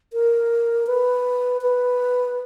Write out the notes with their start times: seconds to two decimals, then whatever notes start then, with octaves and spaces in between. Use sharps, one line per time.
0.13 A#4
0.87 B4
1.62 B4